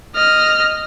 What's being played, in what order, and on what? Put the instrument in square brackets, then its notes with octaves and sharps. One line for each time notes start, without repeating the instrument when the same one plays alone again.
[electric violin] D#5 F6